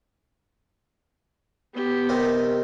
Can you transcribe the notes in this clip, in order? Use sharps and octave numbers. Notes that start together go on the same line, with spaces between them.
B3 G4
C3 D#3